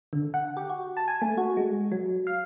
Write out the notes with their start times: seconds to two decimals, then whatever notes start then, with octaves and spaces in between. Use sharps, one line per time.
0.13 D3
0.34 F#5
0.57 G4
0.69 F#4
0.97 A5
1.08 G#5
1.22 A3
1.37 F#4
1.57 G#3
1.92 F#3
2.27 F5